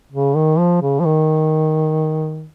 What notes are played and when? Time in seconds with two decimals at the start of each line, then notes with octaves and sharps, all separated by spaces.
0.12 C#3
0.36 D#3
0.58 F3
0.82 C#3
1.00 F3
1.05 D#3